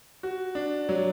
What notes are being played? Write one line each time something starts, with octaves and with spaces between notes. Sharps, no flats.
F#4
D4
F#3